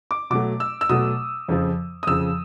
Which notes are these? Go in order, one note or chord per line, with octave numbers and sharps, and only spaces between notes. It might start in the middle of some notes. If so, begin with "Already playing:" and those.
D6
B2 F#3 A3 D6
E6
E6
B2 F#3 A3 D#6
F2 C#3 F3
D#6
F2 C#3 F3 E6